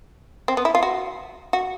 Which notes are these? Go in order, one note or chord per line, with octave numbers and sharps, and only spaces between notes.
C4
B3
E4
F4
F#4
F#4